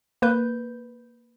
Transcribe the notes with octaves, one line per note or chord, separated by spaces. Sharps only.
A#3 B4 G6